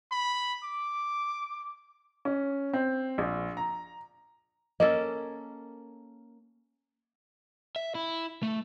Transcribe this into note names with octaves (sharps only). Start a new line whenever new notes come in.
B5
D6
C#4
C4
A#1
A#5
A#3 C#4 A4 D#5
E5
E4
A3